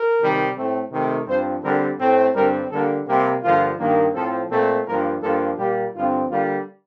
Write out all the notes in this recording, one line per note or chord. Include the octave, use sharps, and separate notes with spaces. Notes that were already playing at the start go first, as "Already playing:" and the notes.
Already playing: A#4
C3 D#3 G3
A2 A3 C4
C3 D#3 A3
G2 F3 C4 C5
D3 G3 C4 A#4
A2 A3 C4
G2 D3 G3 C4 A#4
D3 G3 A#3 A4
C3 G3 A#3 G4
G2 D3 F3 A#3 F4
G2 D#3 A#3
A2 F3 C4 A4
A#2 A3 C4 A4
G2 F3 A#3 A#4
G2 F3 A#3 A4
A#2 G3 A#3 G4
G2 D3 F3 C4 F4
D3 G3 A#3 F4